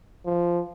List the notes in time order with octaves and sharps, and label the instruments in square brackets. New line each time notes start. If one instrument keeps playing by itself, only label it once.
[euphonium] F3